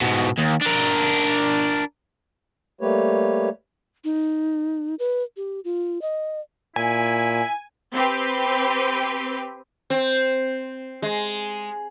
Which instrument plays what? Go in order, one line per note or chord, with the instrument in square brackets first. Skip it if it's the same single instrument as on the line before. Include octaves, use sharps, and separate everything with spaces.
[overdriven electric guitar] G#2 B2
D#2
D4 A#4
[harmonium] G3 A3 A#3 G4 B4 C#5
[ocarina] D#4
B4
G4
F4
D#5
[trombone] A#2 [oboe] E4 [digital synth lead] G#5
[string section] C4 G4 B4
[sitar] C4
G#3